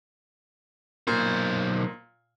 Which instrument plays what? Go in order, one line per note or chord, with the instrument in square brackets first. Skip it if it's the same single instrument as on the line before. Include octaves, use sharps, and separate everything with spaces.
[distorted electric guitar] B1 C5 [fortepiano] A#2